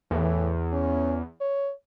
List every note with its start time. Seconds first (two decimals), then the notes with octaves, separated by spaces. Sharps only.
0.11 E2 A2
0.73 C#4
1.41 C#5